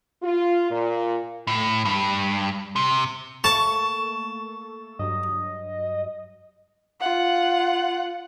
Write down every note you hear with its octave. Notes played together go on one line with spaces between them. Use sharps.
F4
A#2
A2
G2
C3
A3 A#3 A4 A5 C#6
G2 F#3 D#5
F4 F#5